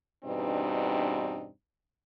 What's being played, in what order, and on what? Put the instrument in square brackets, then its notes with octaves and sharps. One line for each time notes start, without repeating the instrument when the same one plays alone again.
[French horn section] E2 G2 B2 C4 D4 D#4